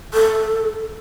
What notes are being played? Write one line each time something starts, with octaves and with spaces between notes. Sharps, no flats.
A4